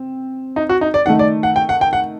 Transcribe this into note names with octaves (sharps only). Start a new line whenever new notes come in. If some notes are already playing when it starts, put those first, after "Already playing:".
Already playing: C4
D#4
F#4
D#4
D5
D#3 A3 D#4 F#5
D5
F#5
G5
F#5
G5
F#5